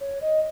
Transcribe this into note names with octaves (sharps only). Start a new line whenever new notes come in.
C#5
D#5